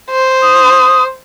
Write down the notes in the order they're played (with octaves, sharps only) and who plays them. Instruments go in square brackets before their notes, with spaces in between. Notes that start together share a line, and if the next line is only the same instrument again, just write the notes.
[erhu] C5
[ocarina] D#6